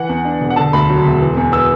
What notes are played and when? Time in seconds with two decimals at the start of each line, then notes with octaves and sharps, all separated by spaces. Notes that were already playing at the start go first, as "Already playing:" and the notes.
Already playing: E3 F#5
0.09 E2
0.25 D4
0.41 E1
0.50 F#5
0.56 D3 A5
0.73 D2 B5
0.89 F#3
1.05 E1
1.21 E3
1.37 E2
1.52 B3 E6